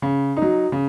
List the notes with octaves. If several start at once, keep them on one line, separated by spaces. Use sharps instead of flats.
C#3
D#4
F#3
C#3